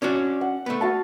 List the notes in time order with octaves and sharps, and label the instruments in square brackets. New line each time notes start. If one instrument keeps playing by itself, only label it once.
[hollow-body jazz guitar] C#4 D4 F#4
[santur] F#5
[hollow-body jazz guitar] A3 B3
[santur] F#4 F5 A5